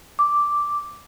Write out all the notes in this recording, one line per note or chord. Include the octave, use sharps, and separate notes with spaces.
D6